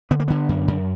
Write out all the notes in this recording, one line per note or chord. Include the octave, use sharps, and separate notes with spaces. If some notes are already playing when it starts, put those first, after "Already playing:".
D3 B3
A#3
D3 B3
F#2
F#2